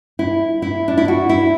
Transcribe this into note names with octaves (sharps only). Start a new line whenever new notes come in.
E4
E4
D4
E4
F#4
E4